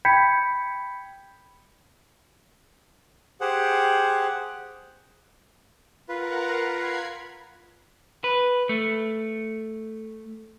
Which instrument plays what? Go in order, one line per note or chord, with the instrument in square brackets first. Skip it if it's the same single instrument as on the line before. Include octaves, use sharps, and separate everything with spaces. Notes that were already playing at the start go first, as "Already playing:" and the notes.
[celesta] G5 B5 G6 G#6 B6 C#7
[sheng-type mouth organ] G4 G#4 C5 F#5
[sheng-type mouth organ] F4 B4 [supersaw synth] A#4 F#5 A#5
[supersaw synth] B5 G#6 C7
[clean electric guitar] B4
A3